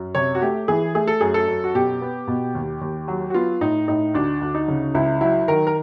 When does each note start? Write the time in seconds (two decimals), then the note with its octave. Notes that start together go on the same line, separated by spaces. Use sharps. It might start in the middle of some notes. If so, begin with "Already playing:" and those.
Already playing: F#2
0.15 C3 C#5
0.35 F#4
0.42 A3 G4
0.68 E3 G#4
0.95 A3 G#4
1.07 A4
1.21 F#2 G#4
1.34 A4
1.48 F#2
1.64 F#4
1.74 B2 G4
2.02 B3
2.27 B2
2.55 D#2
2.81 D#2
3.08 F#3
3.30 F#4
3.34 B3 F4
3.61 A2 D#4
3.88 A2 D#4
4.14 D2 D4
4.41 D2
4.54 D#4
4.68 C#3
4.94 C#2 E4
5.21 F#3 E4
5.48 D#3 A#4
5.67 A#4